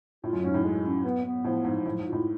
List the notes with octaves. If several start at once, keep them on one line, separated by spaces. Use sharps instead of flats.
A2 F4
F#2
G#2 C#4
A2
G#3
C#4
B3
B3
A2 F3
G#2 F3
A2 F#3
G#2
F4
A2